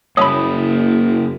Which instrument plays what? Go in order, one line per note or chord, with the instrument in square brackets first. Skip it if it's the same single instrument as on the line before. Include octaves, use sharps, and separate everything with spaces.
[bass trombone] F#1 [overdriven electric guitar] A#3 E4 [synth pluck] C#5 B5 [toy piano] A5 D#6